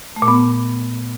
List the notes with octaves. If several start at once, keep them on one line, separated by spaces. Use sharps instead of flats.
A3
A#2
B3